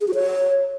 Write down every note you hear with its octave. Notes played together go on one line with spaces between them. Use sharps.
G#4
F#4
C#5